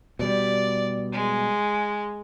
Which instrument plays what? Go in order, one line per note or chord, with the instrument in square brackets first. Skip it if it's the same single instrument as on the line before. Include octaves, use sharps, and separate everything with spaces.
[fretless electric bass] B2 G3 [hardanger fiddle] D5
[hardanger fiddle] G#3